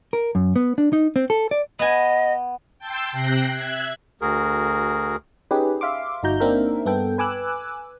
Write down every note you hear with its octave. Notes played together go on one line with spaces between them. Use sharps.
A#4
F#2
B3
D4
D#4
C4
A4
D5
B3 D#5 G#5
G5 A5 C6 E6 G6
C3 G5 F#6 A#6 C7
E5 F#6 G#6
D2 F#4 G#4 A#4
C#4 D#4 G4 G#4 B4
E5 F5 C6 D6
G1 D#4 F#4 A#5 G6
A#3 C4 D4 D#4 A#4 E5
G2 B3 A4 G5
B4 G#5 D6 E6 F#6